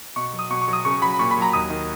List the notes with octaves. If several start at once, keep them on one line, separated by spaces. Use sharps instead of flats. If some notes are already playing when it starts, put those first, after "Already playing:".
B2 C#6
F#3
D#6
B2 C#6
C#6
F#3
D#6
C#3 C#6
F#3 B5
A#2 C#6
B5
F#3 A#5
D#2 D#6
D#3